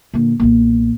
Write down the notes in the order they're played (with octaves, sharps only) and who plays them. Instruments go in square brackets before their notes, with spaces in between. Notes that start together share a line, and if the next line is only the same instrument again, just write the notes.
[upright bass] A#2 D3
B1 A#2